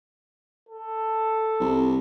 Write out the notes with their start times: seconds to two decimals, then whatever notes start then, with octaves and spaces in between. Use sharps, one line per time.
0.69 A4
1.60 C2